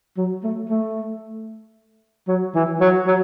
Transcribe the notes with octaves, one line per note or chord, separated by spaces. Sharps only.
F#3
A3
A3
F#3
E3
F#3
F#3